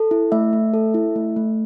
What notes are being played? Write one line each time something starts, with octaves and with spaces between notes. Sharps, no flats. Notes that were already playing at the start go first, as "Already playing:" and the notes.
Already playing: A4
E4
A3 E5
A3
A4
E4
A3
A3